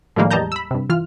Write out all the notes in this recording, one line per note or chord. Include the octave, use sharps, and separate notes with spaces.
A2 D#3 F3 G3 G#3 A#3
E2 G3 D#5 A5 A#5 G6
B5 E6
G2 C3
E3 F4 F6